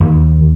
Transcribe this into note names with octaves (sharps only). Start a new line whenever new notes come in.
D#2